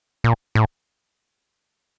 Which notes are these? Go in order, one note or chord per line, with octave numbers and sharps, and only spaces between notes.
A#2
A2